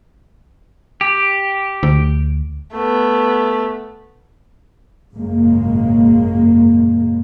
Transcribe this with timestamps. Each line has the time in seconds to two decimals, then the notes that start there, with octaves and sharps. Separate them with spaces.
1.01 G4
1.83 D2
2.72 A3 B3
5.14 G#1 F#2 A#2 C#3 G#3 A#3